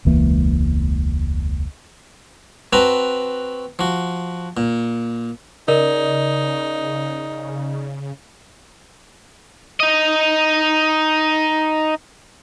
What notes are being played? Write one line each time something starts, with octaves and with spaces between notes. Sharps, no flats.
E1 C#2 E3 A#3
C4 F#4 B4 A5 A#5
F3 F#4
A#2
C#3 D#4 A#4 D5 D#5
D#4 D#5